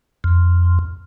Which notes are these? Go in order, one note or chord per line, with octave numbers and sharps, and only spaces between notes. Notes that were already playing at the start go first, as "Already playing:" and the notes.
F2